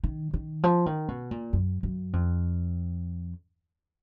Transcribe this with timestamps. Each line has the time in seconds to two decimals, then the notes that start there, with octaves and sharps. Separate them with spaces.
0.04 D#3
0.34 D#3
0.63 F3
0.86 D#3
1.08 B2
1.31 A#2
1.53 F#2
1.83 F#2
2.13 F2